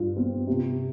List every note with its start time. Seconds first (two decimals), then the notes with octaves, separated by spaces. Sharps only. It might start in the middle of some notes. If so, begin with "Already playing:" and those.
Already playing: G2 F4
0.16 C4
0.47 C3